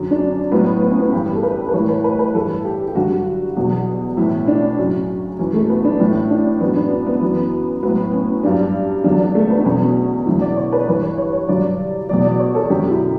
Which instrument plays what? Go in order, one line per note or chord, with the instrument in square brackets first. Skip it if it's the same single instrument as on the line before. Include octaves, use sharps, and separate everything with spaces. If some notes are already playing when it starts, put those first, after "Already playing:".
Already playing: [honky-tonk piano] F#2 D3 F#3 C#4
D4
C#4
A2 F#3 B3
B3
C#4
B3
G2 E3 G4
A4
B4
B4
A2 E3 C#5
B4
B4
B4
G2 E3 A4
G4
G4
G2 D3 F#3 F#4
E2 B2 F#3
A2 E3 E4
D4
F#2 C#3 F#3 C#4
F#2 E3 C#4
A3
B3
D4
A2 E3 E4
D4
F#2 E3 B3
D4
B3
F#2 E3
A2 F#3 B3
C#4
G2 F#3 D4
E2 D3 F#3 D4
D4
A3
B3
D4
E2 B2 F#3 C#4
E2 D3 F#3 E4
D5
C#5
B4
G2 E3 B4
C#5
C#5
C#5
G2 D3 F#3 D5
E2 B2 F#3 D5
D5
C#5
A4
F#2 D3 F#3 G4
E4